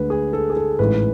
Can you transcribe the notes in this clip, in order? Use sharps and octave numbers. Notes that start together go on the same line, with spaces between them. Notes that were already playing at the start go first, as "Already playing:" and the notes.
Already playing: D2 D3 G#3 B4
G#4
A4
G#4
A4
A1 G#2 E3 G#3 B4